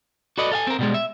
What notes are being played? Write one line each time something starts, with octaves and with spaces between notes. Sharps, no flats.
F#4 A4 B4 D5 D#5
A4 F5 G#5
C4 A#4
B2 G3 G#3
E5